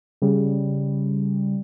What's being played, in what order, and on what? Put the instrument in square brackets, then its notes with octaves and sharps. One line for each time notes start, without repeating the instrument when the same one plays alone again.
[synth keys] C#3 G3